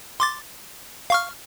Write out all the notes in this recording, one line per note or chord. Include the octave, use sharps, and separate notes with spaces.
C6 D6 A6
F5 C#6 F6